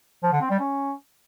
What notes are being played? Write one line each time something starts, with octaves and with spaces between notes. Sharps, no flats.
F3
D3
C4
G3
C#4